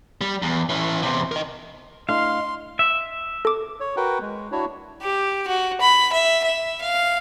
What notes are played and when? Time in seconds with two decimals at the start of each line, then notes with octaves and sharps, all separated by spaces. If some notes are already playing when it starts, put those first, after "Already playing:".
0.21 G3
0.42 E2
0.69 E3 C#4
1.03 E2 C3
1.32 A#4 D#5
2.09 A3 D4 E4 D#5 F5 C6
2.79 E5
3.45 A4 D6
3.80 C#5
3.97 F#4 A#4 B4 F#5 G5
4.22 G#3
4.52 D4 E4 F#4 C#5
5.02 G4
5.47 F#4
5.81 B5
6.13 E5
6.44 E5
6.82 F5